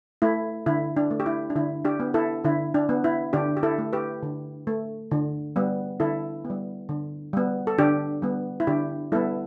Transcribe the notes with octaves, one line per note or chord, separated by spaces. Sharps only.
A3 E4
D3 E4
D4
A3
G4
E4
D4
D3 E4
D4 G4
B3
E4 A4
D3 E4
D4
B3
E4
D3 D4 G4
G4
E4 A4
A3
G4 B4
D3
A3
D3
G3 B3
D3 E4 A4
B3
G3
D3
G3 B3
A4
D3 D4 G4
G3 B3
E4
D3 D4 G4
G3 B3 E4 A4